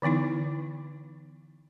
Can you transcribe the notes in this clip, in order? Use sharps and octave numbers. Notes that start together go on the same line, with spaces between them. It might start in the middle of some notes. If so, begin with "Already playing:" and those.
D3 E3 B3 D#4 E4